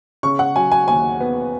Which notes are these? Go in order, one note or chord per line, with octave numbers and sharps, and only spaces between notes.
C#3 C#6
F#5
F#3 G#5
G#5
D#2 G#5
B3